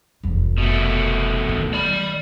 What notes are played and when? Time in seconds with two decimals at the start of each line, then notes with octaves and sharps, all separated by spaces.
0.23 F1 E2
0.58 B2 A3
1.49 D#3
1.73 D5 B5